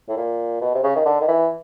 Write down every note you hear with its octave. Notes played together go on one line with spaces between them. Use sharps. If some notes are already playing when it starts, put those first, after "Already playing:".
A2
A#2
B2
C3
C#3
D#3
D3
D#3
E3